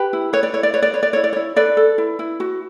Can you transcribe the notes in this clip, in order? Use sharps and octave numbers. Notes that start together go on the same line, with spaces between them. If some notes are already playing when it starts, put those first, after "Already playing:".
Already playing: G4 B4
E4
B4 C#5
D5
E4 C#5
D5
B4 C#5
D5
B4 C#5
D5
E4 C#5
D5
E4 C#5
A4 B4 D5
A4
E4
E4
F#4